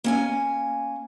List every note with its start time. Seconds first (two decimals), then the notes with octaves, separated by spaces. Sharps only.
0.04 A#3 C#4 G#5